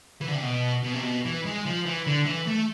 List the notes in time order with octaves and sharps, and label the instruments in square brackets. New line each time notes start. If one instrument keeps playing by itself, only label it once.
[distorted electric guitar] E3
D3
C3
B2
B2
C3
B2
E3
G#3
F3
E3
D3
E3
A3